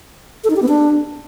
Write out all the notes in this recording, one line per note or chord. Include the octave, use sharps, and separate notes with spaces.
A4
D#4
G4
B3
D4